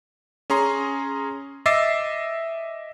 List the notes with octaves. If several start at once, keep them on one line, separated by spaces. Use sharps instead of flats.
C#4 G#4 A#5 C6
D#5 E5 D6 E6 A6 C7